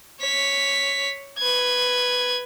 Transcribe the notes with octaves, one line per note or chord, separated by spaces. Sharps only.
C#5 B6
B4 G#6